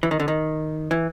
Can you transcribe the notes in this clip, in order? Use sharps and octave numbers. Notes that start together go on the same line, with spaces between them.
E3
D#3
D3
D#3
E3